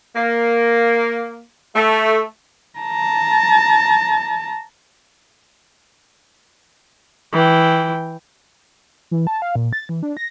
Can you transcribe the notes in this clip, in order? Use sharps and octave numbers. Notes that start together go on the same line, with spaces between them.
A#3
A3
A5 A#5
E3 G5
E3
A5
F5
A#2
A6
E3
D4
A#6